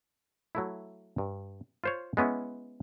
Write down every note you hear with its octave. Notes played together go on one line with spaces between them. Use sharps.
F#3 A3 E4
G2
F4 C5 C#5
G#3 B3 C#4 E4